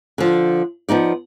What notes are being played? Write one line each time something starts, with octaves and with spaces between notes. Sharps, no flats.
D3 F3
F3 B3 D#4 D5